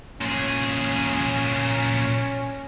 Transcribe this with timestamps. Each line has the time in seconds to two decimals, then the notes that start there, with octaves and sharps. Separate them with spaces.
0.21 A#2 C#4 G#4